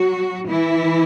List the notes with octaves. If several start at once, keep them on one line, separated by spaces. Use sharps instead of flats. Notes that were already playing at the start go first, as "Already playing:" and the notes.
Already playing: F#3 F#4
E3 E4